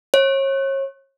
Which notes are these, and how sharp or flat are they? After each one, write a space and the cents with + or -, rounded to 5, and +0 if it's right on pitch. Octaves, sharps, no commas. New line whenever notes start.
C#5 -35